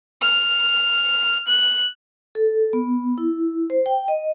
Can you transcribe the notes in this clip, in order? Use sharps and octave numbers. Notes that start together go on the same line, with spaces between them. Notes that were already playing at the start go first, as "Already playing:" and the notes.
F6
F#6
A4
B3
E4
C5
G5
D#5